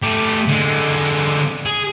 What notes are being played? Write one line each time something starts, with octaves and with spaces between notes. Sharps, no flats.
A3 G4
D3 G#3
G#4